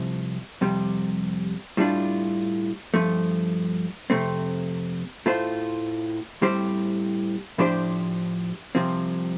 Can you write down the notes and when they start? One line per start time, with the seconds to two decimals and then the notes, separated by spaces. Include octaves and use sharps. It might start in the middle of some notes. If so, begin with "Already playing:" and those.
Already playing: C2 C3 F3
0.61 F2 C3 G3
1.77 A2 G3 D4 F4
2.94 G2 F3 A3
4.10 F2 C3 A3 C4
5.26 A2 A3 F4 C5
6.42 A2 G3 C4 G4 C5
7.58 A2 F3 D4 G4 C5
8.75 C2 C3 F3 C4